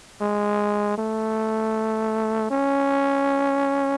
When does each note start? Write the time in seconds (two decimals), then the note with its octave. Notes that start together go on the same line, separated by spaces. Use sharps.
0.21 G#3
0.98 A3
2.50 C#4